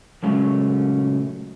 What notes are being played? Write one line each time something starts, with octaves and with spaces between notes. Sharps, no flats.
A#2 C#3 F#3 G#3 A3 C#4